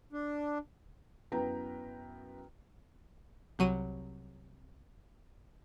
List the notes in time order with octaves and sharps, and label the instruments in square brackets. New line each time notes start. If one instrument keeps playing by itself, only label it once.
[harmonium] D4
[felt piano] F#2 B3 E4 B4 G5 A#5
[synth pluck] C2 F#3 D#7